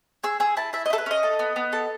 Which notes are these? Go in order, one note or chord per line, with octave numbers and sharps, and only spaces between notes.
G#4 E6
G#4 E6
E4 A5
E4 E5
D#5
E4 A4
B4
C#4 D#5
A4
B3
B3
A4